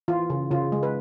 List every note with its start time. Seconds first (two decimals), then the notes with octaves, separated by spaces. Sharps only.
0.08 E3 F4
0.30 C#3
0.51 C#3 F4
0.72 G#3
0.83 B4